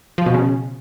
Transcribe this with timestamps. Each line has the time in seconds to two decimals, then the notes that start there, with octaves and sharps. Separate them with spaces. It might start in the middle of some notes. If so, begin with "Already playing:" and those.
0.18 F3
0.26 B2
0.34 C#3